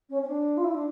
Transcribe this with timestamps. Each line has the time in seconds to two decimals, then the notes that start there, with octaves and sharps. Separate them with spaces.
0.09 C#4
0.22 C#4
0.27 D4
0.57 F4
0.64 E4
0.74 D4